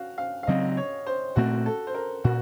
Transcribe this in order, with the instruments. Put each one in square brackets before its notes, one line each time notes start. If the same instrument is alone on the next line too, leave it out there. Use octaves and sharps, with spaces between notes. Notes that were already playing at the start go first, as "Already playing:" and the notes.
Already playing: [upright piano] F#4 F5
F5
F5
[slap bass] C#3 F#3 C4 [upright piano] D#5
[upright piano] C#5
C5
[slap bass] A#2 A3 C4 [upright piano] F#4
[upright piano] A4
C5
A#4
[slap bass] A#2 [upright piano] F#4